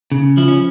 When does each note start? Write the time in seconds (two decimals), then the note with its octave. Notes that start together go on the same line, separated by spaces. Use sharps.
0.12 C#3
0.37 F3 E4
0.48 C#4